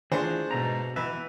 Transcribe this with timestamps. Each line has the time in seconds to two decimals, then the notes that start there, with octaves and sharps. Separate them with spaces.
0.12 E3 A3 D4 F4 G#4 C5
0.51 G#2 B2 A3 A#5
0.96 B2 E3 B4 E5